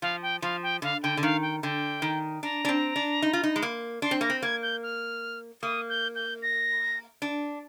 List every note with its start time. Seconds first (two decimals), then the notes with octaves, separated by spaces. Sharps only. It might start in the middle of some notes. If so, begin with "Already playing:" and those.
0.02 F3 F5
0.22 G5
0.42 F3 F5
0.63 G5
0.82 D3 F5
1.03 D3 G5
1.17 D3
1.23 D#3 F5
1.42 G5
1.62 D3 G5
2.02 D#3
2.43 D4 A#5
2.65 D4
2.69 C4
2.96 D4
3.22 D#4
3.33 F4
3.43 D#4
3.56 G#3
3.62 A#3
4.02 D4 C6
4.11 C4
4.21 A#3 A#6
4.30 C4
4.42 A#3 G#6
4.62 G6
4.83 F6
5.62 A#3 D#6
5.89 G6
6.15 G6
6.42 A#6
7.22 D4